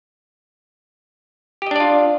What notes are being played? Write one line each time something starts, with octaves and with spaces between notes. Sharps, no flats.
D4 F4 G4 D5 D#5